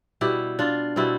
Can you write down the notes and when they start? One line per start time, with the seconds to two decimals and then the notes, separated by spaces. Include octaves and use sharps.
0.21 B2 G3 E4 G4
0.59 D4 F4
0.96 B2 G3 C4 E4